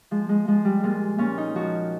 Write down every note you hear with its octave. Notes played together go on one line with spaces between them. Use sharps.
F3 G#3
G#3
F3 G#3
G3
A#2 G#3
A#2 C#4
D#4
F3 F#4